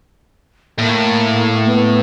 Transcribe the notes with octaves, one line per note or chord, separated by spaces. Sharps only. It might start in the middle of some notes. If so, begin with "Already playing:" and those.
A2 A#3
B3